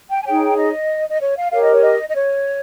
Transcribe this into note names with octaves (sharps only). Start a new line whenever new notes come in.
G5
G#5
D#4 G#4 C#5 G5
D#5
D#5
C#5
F5
G4 A#4 C#5 F5
D#5
C#5
D#5
D#5
C#5